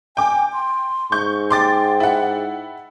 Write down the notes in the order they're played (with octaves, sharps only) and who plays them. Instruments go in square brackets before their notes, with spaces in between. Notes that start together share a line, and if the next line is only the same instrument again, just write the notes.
[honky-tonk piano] G5 D6 [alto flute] G#5
[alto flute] C6
[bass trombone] G#2 [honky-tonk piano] C#6 G6
[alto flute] G5 [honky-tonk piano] C6 D6 A6
[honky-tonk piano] E4 F#5